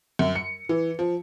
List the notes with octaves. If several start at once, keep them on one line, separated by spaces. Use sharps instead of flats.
F#2
C#7
E3
F3